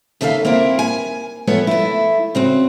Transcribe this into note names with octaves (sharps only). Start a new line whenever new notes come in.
D#2 C#3 A4 E5 F5
A#3 C4 E4 A#4
G#5
F3 A3 B3 C#5
A3 E4
C#3 C4 F#4